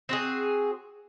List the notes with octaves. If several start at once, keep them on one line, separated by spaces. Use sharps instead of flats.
C4 F#4 G#4